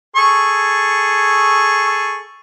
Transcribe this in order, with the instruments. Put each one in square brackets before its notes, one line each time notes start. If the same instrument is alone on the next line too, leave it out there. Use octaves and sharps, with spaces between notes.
[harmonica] G#4 A4 C#6